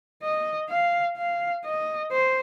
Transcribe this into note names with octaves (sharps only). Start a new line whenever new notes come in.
D#5
F5
F5
D#5
C5